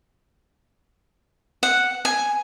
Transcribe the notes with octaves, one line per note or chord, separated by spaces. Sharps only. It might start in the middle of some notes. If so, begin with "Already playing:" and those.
F#5
G#5